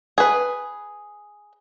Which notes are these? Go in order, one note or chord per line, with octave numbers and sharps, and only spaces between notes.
G#4 B4